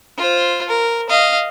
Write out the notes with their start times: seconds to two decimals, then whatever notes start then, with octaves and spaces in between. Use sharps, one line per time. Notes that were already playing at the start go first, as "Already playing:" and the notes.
0.17 F4 C5
0.69 A#4
1.09 D#5 F5